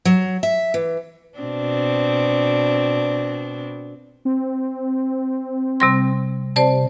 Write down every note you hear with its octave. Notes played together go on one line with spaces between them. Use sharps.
F#3
E5
E3
B2 C4 D4
C4
C3 G3 C6
C3 C5 D5 A5